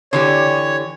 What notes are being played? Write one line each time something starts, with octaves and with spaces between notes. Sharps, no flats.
D3 E3 G4 C#5